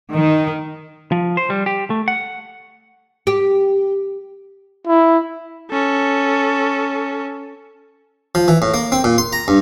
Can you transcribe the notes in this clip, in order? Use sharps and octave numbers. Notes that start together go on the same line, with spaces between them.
D#3
F3
C5
G3
G4
A3
F#5
G4
E4
C#4 A4
F3
E3
A2
A#3
C4
A#2
C6
A#5
G2